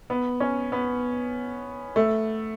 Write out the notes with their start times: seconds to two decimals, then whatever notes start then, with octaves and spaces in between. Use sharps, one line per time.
0.10 B3
0.40 C#4
0.72 B3
1.96 A3